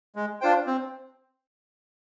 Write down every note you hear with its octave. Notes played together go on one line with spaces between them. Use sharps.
G#3
D4 F4 C5 G5
C4